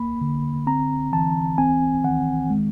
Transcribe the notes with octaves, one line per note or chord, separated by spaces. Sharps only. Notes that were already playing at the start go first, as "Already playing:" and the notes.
Already playing: A#3 B5
D3
C4 A#5
E3 A5
C4 G#5
D#3 F#5
G#3